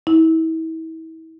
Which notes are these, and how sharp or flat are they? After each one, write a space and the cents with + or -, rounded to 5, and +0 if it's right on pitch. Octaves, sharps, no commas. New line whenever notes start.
E4 -35